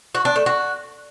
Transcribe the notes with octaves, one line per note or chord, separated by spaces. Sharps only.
F#4
D4
A3
F#4